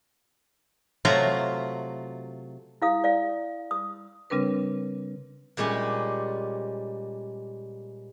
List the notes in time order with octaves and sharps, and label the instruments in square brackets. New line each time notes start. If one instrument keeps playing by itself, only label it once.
[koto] C3 F#3 A3 F4 A#5
[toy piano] E4 F5 D#6
D5 F5
D#6
[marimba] C#3 G3 C4 D4 A#4 B4
[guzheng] A#2 G3 G#3 C#4 G4